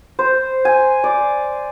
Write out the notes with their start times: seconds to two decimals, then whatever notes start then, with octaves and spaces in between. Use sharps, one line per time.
0.19 C5
0.65 G#5
1.04 D5